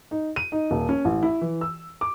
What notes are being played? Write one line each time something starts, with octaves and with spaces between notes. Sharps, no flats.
D#4
D#7
D#4
D#1
C#4
A1
E4
E3
E6
D6